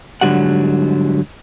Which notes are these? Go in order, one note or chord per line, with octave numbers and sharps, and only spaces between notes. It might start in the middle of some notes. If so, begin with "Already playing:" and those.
G#2 D3 E3 F#3 G3 F#5